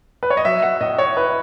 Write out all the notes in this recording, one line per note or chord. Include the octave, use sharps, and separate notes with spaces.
B4
C#5
D#5
F#3 E5
F#5
A2 D#5
C#5
E4 B4